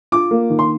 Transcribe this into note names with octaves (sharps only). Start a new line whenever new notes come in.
F4 D6
A#3
D#3
C6